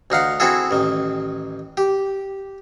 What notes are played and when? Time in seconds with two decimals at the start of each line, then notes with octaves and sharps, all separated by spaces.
0.10 D2 D#4 F5 F#5
0.40 C4 E4 F#4 G#4 A4
0.71 A1 D#3
1.77 G4